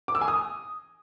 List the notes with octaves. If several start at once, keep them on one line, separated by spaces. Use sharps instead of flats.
D6
E6
G#5
D#6